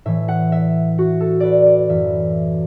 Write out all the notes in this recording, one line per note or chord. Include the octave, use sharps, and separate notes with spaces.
A2 E3 E5
F#5
E5
F#4
A4
B4 D5
D5
F#2 E3 E5